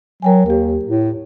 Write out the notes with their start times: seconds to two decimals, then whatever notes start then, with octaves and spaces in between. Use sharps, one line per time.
0.22 F#3 A#4 G5 G#5
0.46 D#2 G4 A#4
0.84 A2